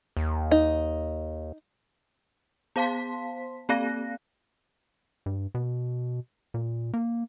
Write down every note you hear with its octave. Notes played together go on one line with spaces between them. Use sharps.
D#2
D#4
B3 C5 F5 A5 C6 B6
A#3 C4 D5 F5 F#6 A#6
G2
B2
A#2
A#3